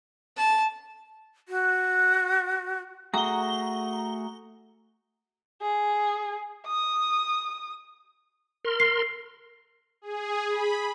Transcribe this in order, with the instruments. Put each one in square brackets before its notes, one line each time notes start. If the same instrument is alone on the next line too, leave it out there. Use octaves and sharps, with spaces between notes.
[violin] A5
[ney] F#4
[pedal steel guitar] A3 F#4 G#4 [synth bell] A#5 G7
[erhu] G#4
D#6
[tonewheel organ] A#4 C6
[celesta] C7
[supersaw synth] G#4
B5